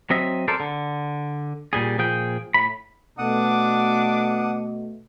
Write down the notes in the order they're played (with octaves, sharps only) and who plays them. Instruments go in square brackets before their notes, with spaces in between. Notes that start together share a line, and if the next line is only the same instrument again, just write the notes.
[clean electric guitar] F#3 C4 D#5 E5
A4 A#4 C5 D5
D3
A#2 G3 G#4
A#2 F3 G#4 G5
A2 B5
[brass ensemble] B2 A3 [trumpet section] D4 D6 [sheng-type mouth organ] F#5 D#6